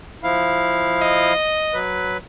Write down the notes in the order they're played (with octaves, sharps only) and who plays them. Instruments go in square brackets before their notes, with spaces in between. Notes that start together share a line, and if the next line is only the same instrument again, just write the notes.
[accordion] F3 E4 F5
[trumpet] D#5
[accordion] F#3 B4